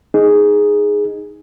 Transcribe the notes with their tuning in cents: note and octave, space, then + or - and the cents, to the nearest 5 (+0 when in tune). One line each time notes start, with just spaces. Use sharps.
D#4 +0 G#4 +0